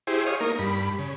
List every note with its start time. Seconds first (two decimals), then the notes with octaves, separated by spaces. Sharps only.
0.07 E4 G4 G#4 C5
0.26 C#5 D#5 F5
0.41 A#3 D#4 A#4
0.59 G2 B5
0.99 C#3